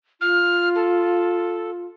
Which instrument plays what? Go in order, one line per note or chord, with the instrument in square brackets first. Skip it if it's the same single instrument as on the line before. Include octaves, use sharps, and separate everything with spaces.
[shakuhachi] F4 [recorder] F6
[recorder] A4